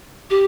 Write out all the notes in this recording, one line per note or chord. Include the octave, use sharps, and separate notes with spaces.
G4